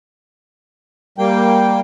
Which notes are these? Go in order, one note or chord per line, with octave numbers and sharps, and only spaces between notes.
G3 A#3 G5